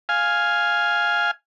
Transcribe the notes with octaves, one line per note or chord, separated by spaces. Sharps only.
F5 G#5